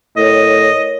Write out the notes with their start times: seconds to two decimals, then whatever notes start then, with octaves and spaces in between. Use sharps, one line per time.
0.17 A2 A#4 C#5 D#5